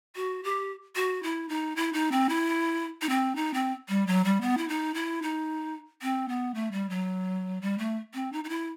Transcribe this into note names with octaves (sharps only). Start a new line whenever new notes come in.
F#4
G4
F#4
E4
D#4
E4
D#4
C4
E4
D#4
C4
D#4
C4
G3
F#3
G3
B3
E4
D#4
E4
D#4
C4
B3
A3
G3
F#3
G3
A3
C4
D#4
D#4
E4